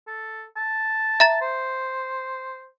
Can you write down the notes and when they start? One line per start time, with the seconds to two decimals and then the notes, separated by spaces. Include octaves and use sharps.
0.07 A4
0.57 A5
1.20 E5 A#5 A6
1.41 C5